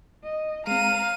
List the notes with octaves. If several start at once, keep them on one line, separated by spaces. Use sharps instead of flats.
D#5
G#3 C4 F5 A#5 D#7